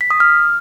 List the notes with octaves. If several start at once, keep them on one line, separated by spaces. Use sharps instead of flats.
B6
D#6
F6